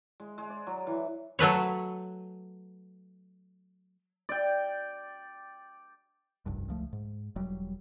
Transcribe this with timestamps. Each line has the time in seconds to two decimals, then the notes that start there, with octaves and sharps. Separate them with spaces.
0.20 G#3
0.38 G#3
0.50 D5
0.67 F#3
0.87 E3
1.39 F#3 A3 B4 C#5
4.29 D5 G5
6.46 F1 C2 G2
6.68 C#2 F3 A3
6.93 G#2
7.36 E1 F#3 G3